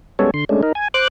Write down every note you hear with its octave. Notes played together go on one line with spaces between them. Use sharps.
G3 G#3 B3 C#4 A4 C#5
D3 C6
G#3 A3 C#4 D4
D#4 A#4
G#5
C5 D6 F#6